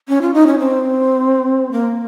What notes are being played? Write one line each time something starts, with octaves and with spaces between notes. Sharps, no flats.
C#4
F4
D#4
C#4
C4
A#3